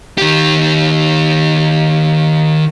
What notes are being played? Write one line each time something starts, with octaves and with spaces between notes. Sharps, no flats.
D#3 G4